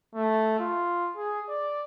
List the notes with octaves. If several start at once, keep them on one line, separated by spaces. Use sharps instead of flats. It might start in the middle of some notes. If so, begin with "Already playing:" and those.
A3
F4
G#4
D5